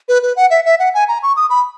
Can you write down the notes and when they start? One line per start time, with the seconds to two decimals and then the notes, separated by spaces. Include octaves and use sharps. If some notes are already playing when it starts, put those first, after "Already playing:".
0.09 B4
0.23 B4
0.36 F#5
0.50 E5
0.65 E5
0.79 F#5
0.94 G#5
1.08 A#5
1.23 C#6
1.36 D#6
1.50 B5